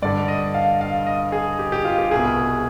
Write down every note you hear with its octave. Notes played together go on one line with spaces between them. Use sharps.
G2 D3 D5
D#5
F5
F5
D#5
G#4
G4
G4
F4
G4
C2 B2 G#4